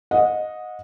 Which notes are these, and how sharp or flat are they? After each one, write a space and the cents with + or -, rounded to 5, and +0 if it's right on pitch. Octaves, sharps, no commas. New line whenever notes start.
D#5 +0 F#5 -30